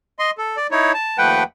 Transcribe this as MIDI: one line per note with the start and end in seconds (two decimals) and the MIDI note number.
0.19 0.31 75
0.19 0.31 84
0.38 0.57 69
0.57 0.67 74
0.71 0.92 63
0.71 0.92 64
0.71 0.92 73
0.94 1.18 81
1.18 1.43 39
1.18 1.43 53
1.18 1.43 57
1.18 1.43 71
1.18 1.43 78
1.18 1.43 79